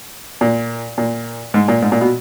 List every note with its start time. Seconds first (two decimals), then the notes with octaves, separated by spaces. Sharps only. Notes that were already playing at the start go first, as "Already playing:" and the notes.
0.41 A#2
0.98 A#2
1.54 G#2
1.68 A#2
1.82 G#2
1.92 A#2
2.01 B2